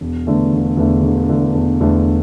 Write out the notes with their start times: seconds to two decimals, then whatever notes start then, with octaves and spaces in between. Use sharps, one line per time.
0.01 E1
0.27 E2 D3 A3
0.53 E1
0.77 E2 D3 A3
1.03 E1
1.29 E2 D3 A3
1.55 E1
1.80 E2 D3 A3